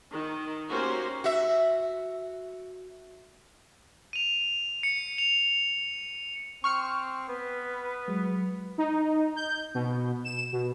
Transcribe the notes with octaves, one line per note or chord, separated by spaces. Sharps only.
D#3
A#3 C#4 F#4 G4 A#4 C5
F#4 E5
D#7 F7
C#7
F7
C4 C#6 F6 C#7
B3 B4
F#3 G#3
D#4
G6
B2
E7
B2